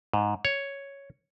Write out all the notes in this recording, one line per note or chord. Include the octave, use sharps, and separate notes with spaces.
G#2
C#5